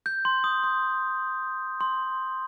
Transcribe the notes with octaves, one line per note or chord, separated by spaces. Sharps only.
G6
C6
D#6
C6
C6